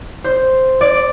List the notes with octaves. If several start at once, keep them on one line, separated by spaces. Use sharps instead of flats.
C5
D5